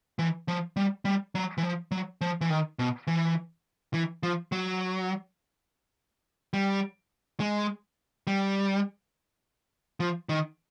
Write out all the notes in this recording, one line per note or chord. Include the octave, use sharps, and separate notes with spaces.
E3
F3
G3
G3
F#3
E3
F3
F#3
F3
E3
D#3
B2
E3
E3
F3
F#3
G3
G#3
G3
F3
D#3